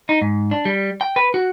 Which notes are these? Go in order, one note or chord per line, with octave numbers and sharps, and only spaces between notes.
D#4
G#2
D4
G3
G5
B4
F#4